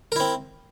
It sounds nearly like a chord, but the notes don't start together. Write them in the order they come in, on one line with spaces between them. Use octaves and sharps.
A#4 E4 C4